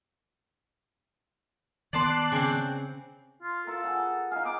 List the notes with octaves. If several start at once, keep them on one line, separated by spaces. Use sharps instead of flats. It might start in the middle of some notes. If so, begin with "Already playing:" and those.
D#3 B3 D5 A5 C6 D6 F#6 C7
C#3 C4
F4
F4 A4 A#4
G#4 F#5
D#4 G#4 F5
B3 D6